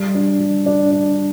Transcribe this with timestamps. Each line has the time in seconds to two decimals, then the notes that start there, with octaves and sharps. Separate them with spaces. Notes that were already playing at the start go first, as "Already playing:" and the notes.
Already playing: G3
0.15 D4
0.40 G3
0.66 D4
0.92 D4